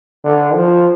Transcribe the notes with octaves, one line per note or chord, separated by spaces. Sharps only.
D3
F3